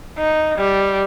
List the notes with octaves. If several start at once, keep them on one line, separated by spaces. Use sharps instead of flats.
D#4
G3